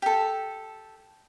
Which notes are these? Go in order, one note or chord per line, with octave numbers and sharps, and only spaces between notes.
G4 A4